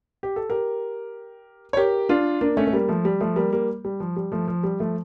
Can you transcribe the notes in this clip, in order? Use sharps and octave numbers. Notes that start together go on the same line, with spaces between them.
G4
A4
G4 A#4
C#5
G4 A#4
D4 F4
A#3 D4
A3 C#4
A3
G3 A#3
F3 A3
G3
F3 A3
G3 A#3
G3 A#3
G3
F3
G3
F3 A3
F3
G3
F3 A3